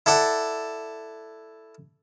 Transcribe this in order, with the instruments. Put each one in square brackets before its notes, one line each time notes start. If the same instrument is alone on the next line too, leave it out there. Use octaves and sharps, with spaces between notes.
[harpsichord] E4 A4 D5 F#5